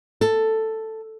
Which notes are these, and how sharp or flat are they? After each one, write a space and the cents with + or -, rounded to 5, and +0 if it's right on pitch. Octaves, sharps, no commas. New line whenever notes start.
A4 +5